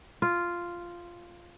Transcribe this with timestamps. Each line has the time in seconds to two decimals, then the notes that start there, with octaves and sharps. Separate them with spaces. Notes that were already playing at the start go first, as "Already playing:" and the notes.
0.22 F4